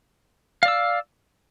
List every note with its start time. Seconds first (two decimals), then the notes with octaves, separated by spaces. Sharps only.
0.63 F5
0.65 D5
0.68 E6